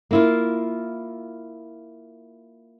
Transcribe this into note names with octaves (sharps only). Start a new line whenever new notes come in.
A#3 E4 F4